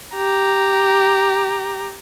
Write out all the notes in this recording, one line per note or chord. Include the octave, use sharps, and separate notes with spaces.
G4 A#5